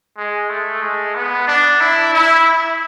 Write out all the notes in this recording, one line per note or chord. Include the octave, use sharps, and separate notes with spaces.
G#3
A3
G#3
B3
D4
E4
E4